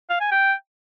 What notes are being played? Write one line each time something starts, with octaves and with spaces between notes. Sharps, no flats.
F5
G#5
G5